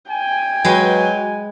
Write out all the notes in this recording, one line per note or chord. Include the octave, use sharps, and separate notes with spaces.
G5 G#5
F#3 G#3 B4